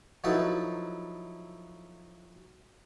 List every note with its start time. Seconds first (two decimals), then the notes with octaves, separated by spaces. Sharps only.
0.24 F3 F#3 D#4 E4 A4 B4